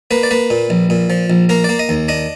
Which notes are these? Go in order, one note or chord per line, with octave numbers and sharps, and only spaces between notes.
A#3 B4
D5
A#3 B4
A#2
A#1
A#2
F3
A#1
A#3 A#4
A#3 D5
D#5
D#2
D4 D#5